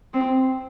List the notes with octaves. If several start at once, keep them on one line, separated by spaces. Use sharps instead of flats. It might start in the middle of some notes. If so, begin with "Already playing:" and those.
C4